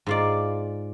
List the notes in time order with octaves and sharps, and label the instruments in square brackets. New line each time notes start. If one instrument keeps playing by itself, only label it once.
[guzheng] G#2 F4 D5